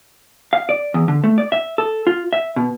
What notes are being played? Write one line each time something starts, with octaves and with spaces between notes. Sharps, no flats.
F5
D5
E2
D3
A3
D5
E5
A4
F4
E5
B2